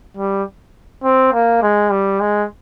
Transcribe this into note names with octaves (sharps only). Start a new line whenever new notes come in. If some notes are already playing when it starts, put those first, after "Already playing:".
G3
C4
A#3
G#3
G3
G#3